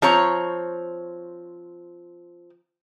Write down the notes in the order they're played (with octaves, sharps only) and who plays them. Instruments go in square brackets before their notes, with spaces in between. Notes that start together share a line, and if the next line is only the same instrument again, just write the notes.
[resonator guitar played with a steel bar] F3 C4 C#5 A#5